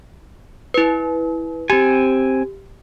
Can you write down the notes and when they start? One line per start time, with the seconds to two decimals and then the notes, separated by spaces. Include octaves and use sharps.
0.74 E4 B4
1.70 C4 G4 G#5